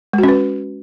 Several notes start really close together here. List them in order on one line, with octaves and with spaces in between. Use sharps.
G#3 F#4 C#4 B4